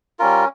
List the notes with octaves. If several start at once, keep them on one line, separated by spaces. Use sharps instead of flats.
G3 C#4 F4 A#4